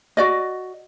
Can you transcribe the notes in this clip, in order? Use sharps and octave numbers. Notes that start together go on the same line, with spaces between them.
F#4 D5 D#5